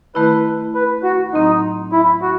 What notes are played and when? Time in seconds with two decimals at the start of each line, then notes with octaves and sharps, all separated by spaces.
0.15 D#3 A3 E4 B4
0.75 B4
1.03 F#4
1.33 A2 F#3 C4 D#4
1.92 E4
2.22 F#4